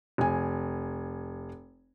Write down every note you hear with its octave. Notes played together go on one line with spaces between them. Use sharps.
F1 G#5